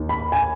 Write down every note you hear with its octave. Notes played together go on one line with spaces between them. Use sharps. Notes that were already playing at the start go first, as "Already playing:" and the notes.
Already playing: D#2 D#3
B5
G#5